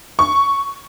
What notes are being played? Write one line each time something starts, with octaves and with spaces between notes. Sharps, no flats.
C#6